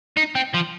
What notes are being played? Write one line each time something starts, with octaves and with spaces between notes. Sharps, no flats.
D#4
C4
F3